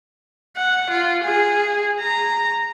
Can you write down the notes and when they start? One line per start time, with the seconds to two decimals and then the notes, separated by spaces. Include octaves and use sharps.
0.56 F#5
0.90 F4
1.24 G#4
2.00 A#5